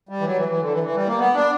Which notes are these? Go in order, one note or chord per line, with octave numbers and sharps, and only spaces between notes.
G3
E3
F#3
E3
E3
D3
E3
E3
G3
A#3
B3
D4